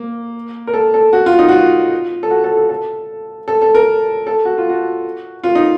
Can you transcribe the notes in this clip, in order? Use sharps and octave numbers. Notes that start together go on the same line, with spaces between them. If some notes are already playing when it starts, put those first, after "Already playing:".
Already playing: A#3
A#4
A4
A4
F#4
F4
D#4
F#4
F4
A4
F#4
A4
A4
A4
A4
A4
A#4
A4
F#4
F4
F#4
F4
D#4